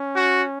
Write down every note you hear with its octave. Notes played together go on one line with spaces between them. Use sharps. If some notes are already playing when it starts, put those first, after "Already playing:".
Already playing: C#4
F#4